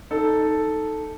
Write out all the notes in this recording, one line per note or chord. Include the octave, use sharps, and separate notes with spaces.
D#4 A4